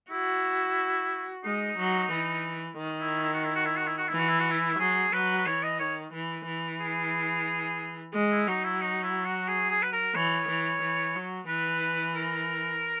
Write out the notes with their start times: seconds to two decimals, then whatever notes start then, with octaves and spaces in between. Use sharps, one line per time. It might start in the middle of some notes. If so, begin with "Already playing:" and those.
0.11 E4 F#4
1.44 G#3 D#4
1.78 F#3
2.12 E3
2.78 D#3
3.01 E4
3.23 E4
3.33 F#4
3.44 E4
3.55 F#4
3.66 E4
3.76 F#4
3.87 E4
3.97 F#4
4.08 E3 E4
4.18 F#4
4.29 E4
4.40 F#4
4.51 E4
4.79 F#3 G#4
5.13 F#3 B4
5.38 B4
5.46 E3 C#5
5.63 D#5
5.80 D#3 C#5
6.13 E3
6.47 E3
6.80 G#4
8.14 G#3
8.31 E4
8.47 F#3 D#4
8.64 E4
8.81 D#4
9.03 E4
9.25 F#4
9.48 G#4
9.70 G#4
9.82 B4
9.93 A#4
10.15 E3 C#5
10.48 E3
10.82 E3
11.15 F#3
11.48 E3 B4
12.15 A#4